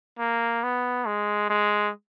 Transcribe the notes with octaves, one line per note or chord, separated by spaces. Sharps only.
A#3
B3
G#3
G#3